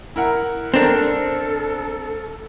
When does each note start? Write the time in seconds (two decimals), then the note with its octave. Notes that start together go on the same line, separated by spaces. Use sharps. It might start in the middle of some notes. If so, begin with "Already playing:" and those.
0.16 E4 A#4 F#5
0.74 C4 D4 A4 A#4 E7